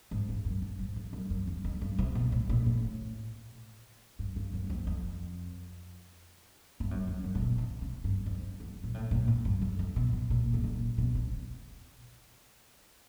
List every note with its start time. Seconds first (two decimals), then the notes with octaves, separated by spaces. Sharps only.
0.11 G#2
0.29 G2
0.45 F#2
0.62 G2
0.79 G#2
0.96 G2
1.13 F#2
1.30 F#2
1.47 E2
1.64 F2
1.81 G2
1.98 C3
2.15 B2
2.32 A2
2.49 A#2
2.66 A2
4.19 G2
4.36 G2
4.53 F#2
4.64 E2
4.70 F2
4.87 F2
6.80 G2
6.91 F#2
7.07 F2
7.24 F#2
7.35 A#2
7.42 B2
7.58 C3
7.81 C#3
8.04 G2
8.26 F2
8.60 E2
8.83 A#2
8.94 A2
9.11 A#2
9.28 A2
9.45 G2
9.62 F2
9.79 F2
9.96 B2
10.13 B2
10.30 A#2
10.54 B2
10.64 A#2
10.98 B2
11.15 C3